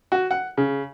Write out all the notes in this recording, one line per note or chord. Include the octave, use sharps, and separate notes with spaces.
F#4
F#5
C#3